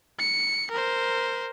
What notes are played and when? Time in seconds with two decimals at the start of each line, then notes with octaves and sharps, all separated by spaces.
0.19 C#7
0.71 A#4 C5